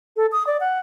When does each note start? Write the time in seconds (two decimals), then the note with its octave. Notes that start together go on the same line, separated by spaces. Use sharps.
0.17 A4
0.32 D#6
0.47 D5
0.60 F#5